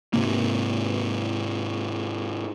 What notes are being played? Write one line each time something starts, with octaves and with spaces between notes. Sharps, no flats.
G#2 C3 A#3